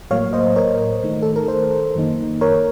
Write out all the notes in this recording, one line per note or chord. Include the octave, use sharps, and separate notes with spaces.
A2 F#3 A#3 C#5 F5
C5 D#5
A#4 C#5
D#3 A3 D#4
A4
A#4
A4 C5
F#2 D#3 A#3 D#4
A#4 C#5